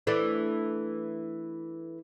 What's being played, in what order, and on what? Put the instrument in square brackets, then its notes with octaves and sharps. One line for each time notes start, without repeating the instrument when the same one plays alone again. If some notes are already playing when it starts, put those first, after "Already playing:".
[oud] E3 A3 D4